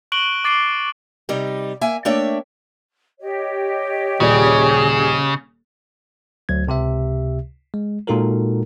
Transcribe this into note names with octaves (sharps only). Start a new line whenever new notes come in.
C#6 F#6 D7 F#7 G7
D6 A6 C7 D7 F#7 G7
C3 G3 D#4
A#3 E5 G#5
A3 A#3 D4 C#5 E5 G5
G4 C#5 D#5
D#1 C#3 G#4 D5
D2 F#3 G#6
C#2 C3 G4 E5
G#3
A#2 G#3 D#4 F#4 A4 A#4